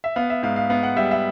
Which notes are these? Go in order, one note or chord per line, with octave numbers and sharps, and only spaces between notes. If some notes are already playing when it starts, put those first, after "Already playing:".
E5
B3 F5
E5
G#2 F5
F5
B3 F5
F#5
G3 E5
E5